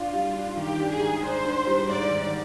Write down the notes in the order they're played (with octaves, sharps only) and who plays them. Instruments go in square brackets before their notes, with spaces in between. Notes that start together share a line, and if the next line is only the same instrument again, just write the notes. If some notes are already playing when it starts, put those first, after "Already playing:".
Already playing: [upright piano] D4 [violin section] F4
[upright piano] G3
D4
[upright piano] D#3 [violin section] G4
[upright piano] D4
[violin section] G#4
[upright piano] G#2
[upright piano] D4 [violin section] C5
[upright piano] D4
G3
[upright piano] G#2 [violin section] D5
[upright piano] D#3